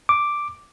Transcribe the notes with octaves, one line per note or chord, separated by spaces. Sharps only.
D6